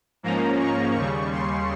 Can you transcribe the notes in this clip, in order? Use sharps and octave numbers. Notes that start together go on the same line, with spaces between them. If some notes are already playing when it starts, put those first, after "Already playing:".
G#2 F3 A#3 C#4 A#5
C#6
D#2 C#3 G3 C#6
C6